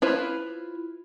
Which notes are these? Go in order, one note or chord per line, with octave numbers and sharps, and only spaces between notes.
E4 F4 B4 C5